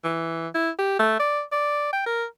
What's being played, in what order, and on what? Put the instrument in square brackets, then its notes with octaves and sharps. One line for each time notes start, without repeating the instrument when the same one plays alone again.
[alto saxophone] E3
E4
G4
A3
D5
D5
G5
A#4